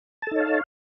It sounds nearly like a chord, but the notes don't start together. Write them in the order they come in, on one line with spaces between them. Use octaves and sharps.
A5 A4 D#4 C#5 F5